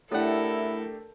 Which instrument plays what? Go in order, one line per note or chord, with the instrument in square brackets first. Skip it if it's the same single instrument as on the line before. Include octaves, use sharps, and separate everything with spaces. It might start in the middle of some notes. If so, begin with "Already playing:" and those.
[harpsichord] A2 F#5 [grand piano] A3 D4 G4 [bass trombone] E4 [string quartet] A4 A#4